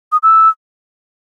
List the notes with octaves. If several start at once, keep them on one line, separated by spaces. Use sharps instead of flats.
D#6
E6